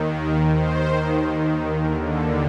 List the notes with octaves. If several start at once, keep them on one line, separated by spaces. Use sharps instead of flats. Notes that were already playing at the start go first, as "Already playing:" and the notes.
Already playing: D#2 D#3
A#4
C5
D#2 D3 A#4
A4